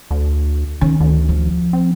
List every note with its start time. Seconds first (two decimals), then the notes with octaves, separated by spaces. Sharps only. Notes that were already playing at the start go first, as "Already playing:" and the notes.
0.11 D2
0.81 D#3 C#4
1.00 D2
1.29 F3
1.73 C4